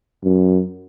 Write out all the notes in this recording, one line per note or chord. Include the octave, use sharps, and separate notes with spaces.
F#2